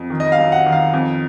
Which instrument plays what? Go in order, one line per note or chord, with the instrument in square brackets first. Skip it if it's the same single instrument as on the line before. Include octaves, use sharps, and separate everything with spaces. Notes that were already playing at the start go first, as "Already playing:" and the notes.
Already playing: [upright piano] F2
D#3
D#5
F5
F#2
F#5
D#3
F5
F2